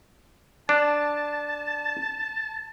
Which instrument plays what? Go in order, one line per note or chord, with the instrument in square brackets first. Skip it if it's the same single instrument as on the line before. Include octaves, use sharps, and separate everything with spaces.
[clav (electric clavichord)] D4 [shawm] A5